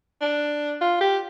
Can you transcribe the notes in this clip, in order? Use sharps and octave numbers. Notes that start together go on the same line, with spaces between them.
D4
F4
G4